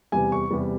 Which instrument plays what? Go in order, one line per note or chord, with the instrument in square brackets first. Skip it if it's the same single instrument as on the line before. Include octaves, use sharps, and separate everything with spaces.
[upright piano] E2 C3 E3 G3 G#5
C#6
E2 C3 E3 G3